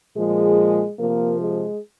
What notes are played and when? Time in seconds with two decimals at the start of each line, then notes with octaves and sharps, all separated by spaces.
0.14 A#2 F3 G#3 G#4
0.97 C3 F3 A#3 A#4
1.39 G#3 G#4